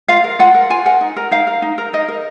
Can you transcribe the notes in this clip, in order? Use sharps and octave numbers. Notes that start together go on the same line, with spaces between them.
F4 F5
A#4
F4 F#5
A#4
F4 G#5
A#4 F#5
D#4
A#4
D#4 F5
A#4
D#4
A#4
D#4 D#5
A#4